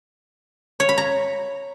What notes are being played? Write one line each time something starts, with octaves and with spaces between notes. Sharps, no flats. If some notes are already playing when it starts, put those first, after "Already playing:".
C#5
B5
A#5